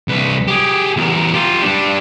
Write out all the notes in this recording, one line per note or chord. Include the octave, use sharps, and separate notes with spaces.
C2 B4
G4 G#4
E2 A#4
F4 G4
G3 D4